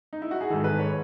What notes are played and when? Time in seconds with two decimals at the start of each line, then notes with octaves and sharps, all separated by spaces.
0.13 D#4
0.22 E4
0.31 F#4
0.41 G#4
0.50 G#2 D#3 A4
0.64 B4
0.79 C#5